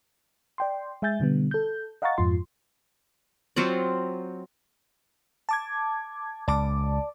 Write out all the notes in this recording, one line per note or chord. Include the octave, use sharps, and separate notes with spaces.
D5 G5 C6
G#3 E5 G#5 G6 A6
B2 D3 G3 B3
A4 G6
D#5 F5 F#5 A#5 C#6 A6
F2 G#2 F4 C6
F#3 C4 F4 D5
A5 D6 G#6
C#2 D5 A5 D6